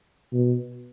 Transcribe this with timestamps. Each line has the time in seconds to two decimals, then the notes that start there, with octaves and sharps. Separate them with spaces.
0.33 B2